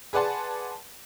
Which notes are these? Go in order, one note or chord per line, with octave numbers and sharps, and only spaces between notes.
G#4 B4 D5 F#5 A5 C6